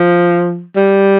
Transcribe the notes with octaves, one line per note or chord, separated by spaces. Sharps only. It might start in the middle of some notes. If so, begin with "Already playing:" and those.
Already playing: F3
G3